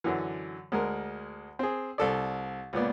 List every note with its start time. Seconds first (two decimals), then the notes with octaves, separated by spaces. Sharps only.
0.04 F#2 D3 E3
0.72 D2 G#3 A#4
1.59 C4 G#4
1.98 C2 A4 D5
2.73 C#2 A#2 B3 D5